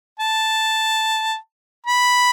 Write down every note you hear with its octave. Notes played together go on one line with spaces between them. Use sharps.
A5
B5